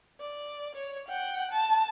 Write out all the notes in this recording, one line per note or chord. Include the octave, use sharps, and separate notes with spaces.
D5
C#5
F#5 G5
A5